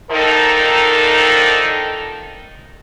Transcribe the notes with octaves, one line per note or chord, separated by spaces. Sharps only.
D3 D#3 F3 D#4 A4 A#4